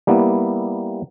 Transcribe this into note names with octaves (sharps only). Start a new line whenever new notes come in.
G3 A#3 B3 E4